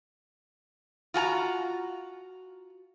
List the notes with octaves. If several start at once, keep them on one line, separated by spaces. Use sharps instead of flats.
F4 F#4 G#5 A#5